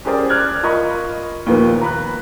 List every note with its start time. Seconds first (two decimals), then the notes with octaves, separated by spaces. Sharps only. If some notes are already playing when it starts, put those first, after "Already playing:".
0.05 C#4 G4 G#4 A#4 C5 D5
0.29 D5 F6 F#6 G#6
0.63 F4 A#4 D#5 B5 C#6
1.46 D#2 A#2 F3 B3
1.81 A#5 B5 F#6